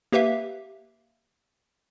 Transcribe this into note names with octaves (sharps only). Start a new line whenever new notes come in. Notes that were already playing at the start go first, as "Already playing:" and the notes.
A#3 G4 B4 E5 F5